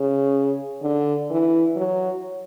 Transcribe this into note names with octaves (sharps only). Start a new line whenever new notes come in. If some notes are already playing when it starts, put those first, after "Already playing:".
Already playing: C#3
D3
E3
F#3